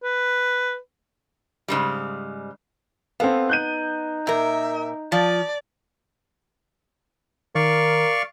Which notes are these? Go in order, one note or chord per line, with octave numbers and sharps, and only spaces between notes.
B4
G#2 C#3 G3
B3 C4 A4 F5
D#4 F#6 G6 D#7
A#2 A#4 E5
F3 D5
D#3 A#4 D5 F5 C#6